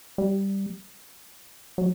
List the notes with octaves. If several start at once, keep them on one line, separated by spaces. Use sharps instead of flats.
G3
F#3